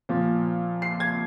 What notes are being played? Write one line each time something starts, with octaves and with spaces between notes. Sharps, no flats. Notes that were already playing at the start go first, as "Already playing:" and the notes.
A#2 F3
C7
G#6